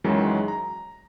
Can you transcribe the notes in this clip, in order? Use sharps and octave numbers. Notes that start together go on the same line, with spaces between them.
F#2 D#3 E3 F#3 G#3
A#5